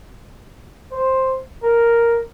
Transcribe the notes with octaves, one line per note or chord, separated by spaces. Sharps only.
C5
A#4